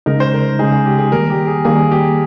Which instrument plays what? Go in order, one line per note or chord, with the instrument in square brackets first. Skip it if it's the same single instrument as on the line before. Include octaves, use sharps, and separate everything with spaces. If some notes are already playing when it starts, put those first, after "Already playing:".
[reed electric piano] C#3 G#3 D#4 [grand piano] A#4
[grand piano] C5
A#4
[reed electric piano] C#3 G#3 D#4 [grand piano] G#4
[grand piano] G#4
G4
G#4
[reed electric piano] D#3 G3 A#3 [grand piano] A#4
[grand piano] G4
G#4
[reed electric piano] D#3 G3 A#3 [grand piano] G#4
[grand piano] G4